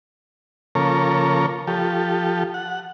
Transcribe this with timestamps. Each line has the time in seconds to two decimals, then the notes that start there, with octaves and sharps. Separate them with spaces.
0.75 C#3 F3 A#3 A4 A#4 C#5
1.67 F3 G4 A4
2.54 F#5